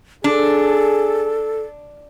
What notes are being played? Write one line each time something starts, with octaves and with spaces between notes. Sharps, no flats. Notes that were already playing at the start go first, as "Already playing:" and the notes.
D4 G#4 A4